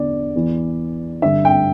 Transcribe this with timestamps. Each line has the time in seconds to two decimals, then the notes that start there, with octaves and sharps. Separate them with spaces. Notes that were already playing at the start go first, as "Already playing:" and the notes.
Already playing: E2 D3 D5
0.35 E2 E3
1.22 G2 D3 E5
1.45 G5